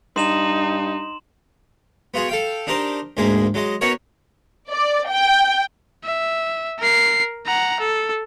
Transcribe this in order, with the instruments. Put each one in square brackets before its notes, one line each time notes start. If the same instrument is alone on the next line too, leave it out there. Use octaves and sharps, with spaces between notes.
[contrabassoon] G2 [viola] D#4 [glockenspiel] C6 E7 F#7
[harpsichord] B3 F4 F#4 G#4
A4 F5 G5
D4 D#4 G4 A#4 C5
D2 G#2 G#3 A#3 G#4
F#3 G#3 D#5
B3 C#4 D#4 F#4 A#4 C#5
[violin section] D5
G5
[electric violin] E5
A#4 C7
F#5 A#5
A4